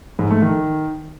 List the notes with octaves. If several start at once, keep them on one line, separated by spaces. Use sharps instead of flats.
G#2
A3
D#3